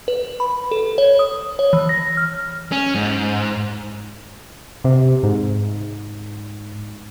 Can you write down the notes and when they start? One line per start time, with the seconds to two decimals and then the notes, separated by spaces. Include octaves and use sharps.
0.08 B4
0.40 B5
0.71 A4
0.98 C#5
1.19 D#6
1.59 C#5
1.73 E3
1.89 A#6
2.17 F6
2.72 C#4
2.95 G#2
4.84 C3
5.23 G#2